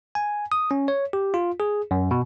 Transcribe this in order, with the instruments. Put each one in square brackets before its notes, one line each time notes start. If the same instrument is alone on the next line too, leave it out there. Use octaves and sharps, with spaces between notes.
[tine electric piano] G#5
D#6
C#4
C#5
G4
F4
G#4
F#2
B2